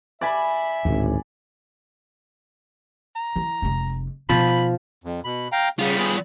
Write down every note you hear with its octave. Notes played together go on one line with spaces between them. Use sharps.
D5 E5 G#5 B5
G#1 D2 A2
A#5
E3
F1 G#3
B2 F3 D#4 B5
F2
B2 B5
F5 G5 A#5
C#3 G3 F4
B3 G#4 B5